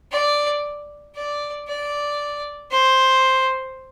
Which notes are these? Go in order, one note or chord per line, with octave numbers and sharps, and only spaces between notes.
D5
D5
D5
C5